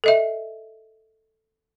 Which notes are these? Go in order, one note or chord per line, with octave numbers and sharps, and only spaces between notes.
A4 D#5 E5